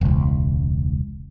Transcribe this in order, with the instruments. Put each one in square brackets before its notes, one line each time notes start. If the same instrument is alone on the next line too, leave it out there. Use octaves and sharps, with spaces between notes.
[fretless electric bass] E1 C#2